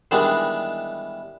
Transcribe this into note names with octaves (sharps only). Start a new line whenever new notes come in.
D#3 E3 G3 G#3 B3 D4